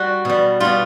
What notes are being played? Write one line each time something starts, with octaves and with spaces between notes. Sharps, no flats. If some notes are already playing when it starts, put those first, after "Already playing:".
Already playing: G3 F#4
B2 G3
B2 G3 F4